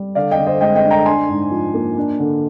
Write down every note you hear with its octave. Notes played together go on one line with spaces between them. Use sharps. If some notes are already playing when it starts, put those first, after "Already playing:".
Already playing: G3
D3 D5 F5
D#5 G5
D3
C5 D#5
G#3 D#5 G5
D#5 G5
D4
G5 A#5
D4 G#5 C6
G#2
F3
A#3
D4
D3